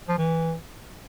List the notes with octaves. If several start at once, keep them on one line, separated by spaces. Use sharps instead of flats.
F3
E3